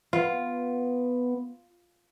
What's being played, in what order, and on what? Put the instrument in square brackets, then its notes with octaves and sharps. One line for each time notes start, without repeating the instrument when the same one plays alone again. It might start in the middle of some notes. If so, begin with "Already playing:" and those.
[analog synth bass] B3 [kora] F4